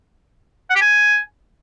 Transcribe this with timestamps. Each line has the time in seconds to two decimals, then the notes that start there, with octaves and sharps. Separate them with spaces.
0.70 F#5
0.76 G4
0.81 G#5